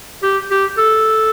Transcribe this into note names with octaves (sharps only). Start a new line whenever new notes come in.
G4
G4
A4